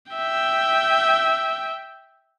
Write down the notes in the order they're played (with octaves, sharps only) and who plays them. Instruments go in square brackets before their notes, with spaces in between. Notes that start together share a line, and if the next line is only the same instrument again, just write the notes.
[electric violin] E5 G5